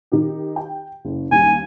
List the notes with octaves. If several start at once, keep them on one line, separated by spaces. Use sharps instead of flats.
D#3 D#4 G4
G5
F#1
D#2 G3 G#5